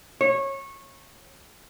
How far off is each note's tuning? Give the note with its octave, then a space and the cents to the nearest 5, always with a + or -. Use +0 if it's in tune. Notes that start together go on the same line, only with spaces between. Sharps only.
C#5 -20